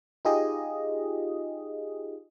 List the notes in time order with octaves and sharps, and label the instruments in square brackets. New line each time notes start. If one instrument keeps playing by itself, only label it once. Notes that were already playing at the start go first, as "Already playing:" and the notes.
[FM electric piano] D#4 F4 G4 G#4 D#5